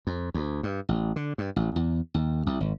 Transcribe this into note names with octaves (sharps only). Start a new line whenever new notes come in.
F2
D2
G2
A1
D3
G2
A1
E2
D#2
C2
G#1